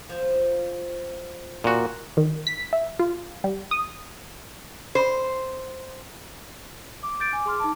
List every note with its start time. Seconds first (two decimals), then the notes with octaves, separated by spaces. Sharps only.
0.09 F3
1.64 A#2 F#4
2.17 D#3
2.47 B6
2.73 E5
2.99 F4
3.44 G3
3.71 D#6
4.95 C5
7.03 D6
7.20 G6 A6 D7
7.33 G#5
7.46 G#4 C6 F6
7.60 D#4 A5